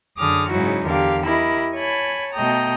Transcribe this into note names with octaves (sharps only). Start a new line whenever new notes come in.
F#2 D3 G#4 D6 D#6 F6
G#2 C#3 F#3 D#4 E4 F#4
E2 D3 G4 A#4 F5
E4 G4 A#4 D#5 B5
C#5 G#5 A5 B5
B2 A3 D#5 G5 A#5